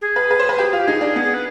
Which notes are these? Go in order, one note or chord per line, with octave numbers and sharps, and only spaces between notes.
G#4
B4
B4
C5
B4
G4
F4
G4
D#4 G#4
D4
B3
G#4
B4